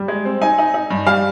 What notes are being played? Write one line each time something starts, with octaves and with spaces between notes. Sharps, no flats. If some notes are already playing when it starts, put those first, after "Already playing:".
Already playing: G3
G#3
C4
D#4 G#5
D#4
D#4
G2
G3 F5